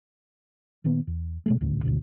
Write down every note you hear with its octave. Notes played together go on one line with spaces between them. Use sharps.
A#2 D#3 A#3 B3
E2
B2 G#3 A3
D#1 A1 D2 A2
G#1 D2 B2 D3